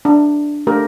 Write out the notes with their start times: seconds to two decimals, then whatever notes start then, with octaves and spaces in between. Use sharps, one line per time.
0.05 D4
0.67 A3 D4 G4 A#4